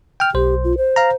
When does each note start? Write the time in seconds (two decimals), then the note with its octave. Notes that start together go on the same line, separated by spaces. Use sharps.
0.20 G5 F6
0.34 B1 G4 C5
0.64 F4
0.78 C5
0.96 F5 A#5